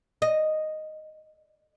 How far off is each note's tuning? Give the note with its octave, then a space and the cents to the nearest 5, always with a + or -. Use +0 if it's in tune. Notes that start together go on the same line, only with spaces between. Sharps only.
D#5 -5